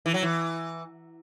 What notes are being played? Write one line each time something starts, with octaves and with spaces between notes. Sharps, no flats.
E3
F#3
E3